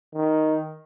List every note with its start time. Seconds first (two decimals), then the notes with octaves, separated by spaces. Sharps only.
0.14 D#3